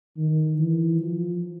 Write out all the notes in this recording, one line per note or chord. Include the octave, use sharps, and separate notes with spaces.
D#3
E3
F3